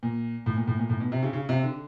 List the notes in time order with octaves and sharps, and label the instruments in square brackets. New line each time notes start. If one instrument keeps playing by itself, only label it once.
[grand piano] A#2
A2
A#2
A2
A#2
A2
B2
C3
C#3
C#3
C3
D3